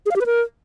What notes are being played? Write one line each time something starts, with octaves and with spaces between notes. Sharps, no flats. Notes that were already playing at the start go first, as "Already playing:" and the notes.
G#4
F5
G4
B4
A#4